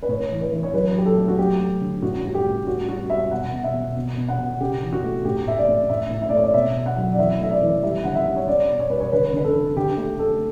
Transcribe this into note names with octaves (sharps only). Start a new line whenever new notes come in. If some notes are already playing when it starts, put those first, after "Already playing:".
B4
A2 C#5
E3
B4
E3
C#5
F#3 B4
F#3 G4
A4
A3
F#4
F#3 G4
A3
D3
A2 F#4
G3 F#4
G4
A2
G3 F#4
G3 F#4
G3 E5
B2 F#5
B2
E5
B2
B2
B2
F#5
B2
C#3 G4
E3
F#4
A3
A2 G4
A2 E5
D5
A2
A2 E5
A2
E5
D5
A3 C#5
D5
B2 E5
B2
F#5
F#3
D5
E3 E5
A3 E5
D5
E3
G3 E5
D3 F#5
E5
G3
C#5
G3 D5
B2
C#5
G3 B4
C#5
D3 B4
D3 B4
A4
D3
D3 G4
A3 G4
A3 A4